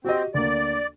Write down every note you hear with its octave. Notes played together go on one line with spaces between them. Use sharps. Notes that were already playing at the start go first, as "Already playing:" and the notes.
C4 F#4 G4 D#5
D2 A#3 D5